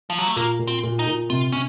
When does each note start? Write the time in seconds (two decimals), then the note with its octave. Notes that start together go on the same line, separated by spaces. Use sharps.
0.10 F3
0.19 F#3
0.27 A3
0.36 A#2 A#3
0.59 A#2
0.67 C4
0.83 A#2
0.99 D#4
1.06 A#2
1.30 C3 F4
1.52 C3 C#4